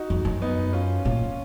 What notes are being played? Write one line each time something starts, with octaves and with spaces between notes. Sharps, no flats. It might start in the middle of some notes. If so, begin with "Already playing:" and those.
Already playing: D#4 F#4
F2
F#2
B3 D#4
C#4 F4
A#2 C#4 F4